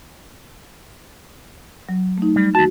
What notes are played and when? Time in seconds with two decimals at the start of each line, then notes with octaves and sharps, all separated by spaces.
1.89 F#3
2.18 A3 D#4
2.36 G3
2.55 D#2 F#4 A5